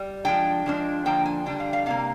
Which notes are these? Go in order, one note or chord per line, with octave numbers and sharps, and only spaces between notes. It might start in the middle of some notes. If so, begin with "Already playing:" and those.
Already playing: G3
F3 G#3 D4 G5
F3 G#3 D4
D3 F3 A#3 D4 G5
G#5
D3 G3 D4 G5
F5
F5
C3 G3 A#3 F5